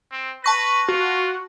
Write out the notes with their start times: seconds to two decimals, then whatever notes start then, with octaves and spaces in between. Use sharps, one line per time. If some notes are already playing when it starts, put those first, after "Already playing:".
0.12 C4
0.44 B4 A5 C#6 A#6
0.88 F4 F#4